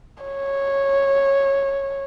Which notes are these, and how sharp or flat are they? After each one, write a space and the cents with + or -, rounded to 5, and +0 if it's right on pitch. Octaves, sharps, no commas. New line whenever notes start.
C#5 -10